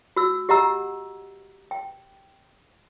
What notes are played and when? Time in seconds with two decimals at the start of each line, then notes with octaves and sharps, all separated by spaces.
0.16 F#4 E6
0.49 G4 D#5 F#5 A#5 E6
1.71 G5